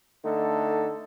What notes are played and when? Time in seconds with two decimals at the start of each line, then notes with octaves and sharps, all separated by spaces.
0.25 D3 A3 D#4 A4